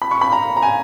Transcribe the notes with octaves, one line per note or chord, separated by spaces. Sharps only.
B5
C#6
B5
A#5
A#5
G#5